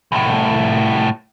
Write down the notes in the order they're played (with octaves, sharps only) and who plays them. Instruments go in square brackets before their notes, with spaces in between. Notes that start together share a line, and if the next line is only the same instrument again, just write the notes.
[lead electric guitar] C2 A2